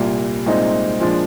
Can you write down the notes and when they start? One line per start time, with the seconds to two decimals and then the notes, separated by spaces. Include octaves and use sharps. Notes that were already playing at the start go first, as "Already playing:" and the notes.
Already playing: C2 A#2 G3
0.46 C2 A#2 G#3 C4 D#4
1.00 A#2 F3 G#3 D4